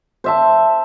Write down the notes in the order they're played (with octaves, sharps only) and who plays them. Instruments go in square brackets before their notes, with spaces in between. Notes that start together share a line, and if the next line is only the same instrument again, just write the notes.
[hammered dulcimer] C5 E5 A5